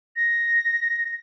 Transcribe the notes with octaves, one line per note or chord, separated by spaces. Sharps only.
A#6